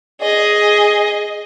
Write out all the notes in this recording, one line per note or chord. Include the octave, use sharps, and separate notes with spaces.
G#4 D#5